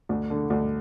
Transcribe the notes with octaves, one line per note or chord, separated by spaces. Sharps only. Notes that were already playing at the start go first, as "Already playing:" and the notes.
D2
D3
D2